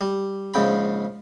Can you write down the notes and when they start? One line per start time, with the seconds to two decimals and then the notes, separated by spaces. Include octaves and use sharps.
0.01 G3
0.54 A#1 G#2 C#3 G5 B5